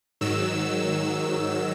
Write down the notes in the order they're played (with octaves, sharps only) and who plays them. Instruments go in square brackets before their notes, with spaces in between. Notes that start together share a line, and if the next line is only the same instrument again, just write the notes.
[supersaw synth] G#2 D#3 F#3 E6